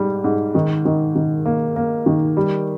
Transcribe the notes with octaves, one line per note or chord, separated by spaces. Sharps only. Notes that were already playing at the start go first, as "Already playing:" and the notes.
Already playing: G#2 G3
G#2
D#3
D#3
D#3
A#3
A#3
D#3
G3